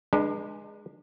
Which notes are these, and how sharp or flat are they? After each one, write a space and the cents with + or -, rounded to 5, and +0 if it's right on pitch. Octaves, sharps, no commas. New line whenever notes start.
G#3 +0 D4 +30 B4 -30